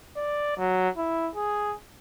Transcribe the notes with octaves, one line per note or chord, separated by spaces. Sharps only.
D5
F#3
E4
G#4